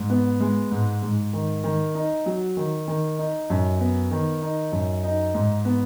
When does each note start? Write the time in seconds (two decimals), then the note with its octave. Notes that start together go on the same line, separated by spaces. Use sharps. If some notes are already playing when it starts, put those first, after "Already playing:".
Already playing: G#2
0.10 B3
0.40 G#3
0.71 G#2
1.02 G#2
1.33 D#3
1.64 D#3
1.95 D#4
2.26 F#3
2.57 D#3
2.88 D#3
3.19 D#4
3.50 F#2
3.80 B3
4.11 D#3
4.42 D#4
4.72 F#2
5.04 D#4
5.34 G#2
5.65 B3